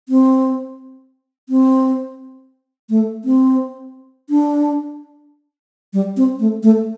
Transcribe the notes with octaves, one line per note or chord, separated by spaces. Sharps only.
C4
C4
A3
C4
D4
G3
C4
A3
A3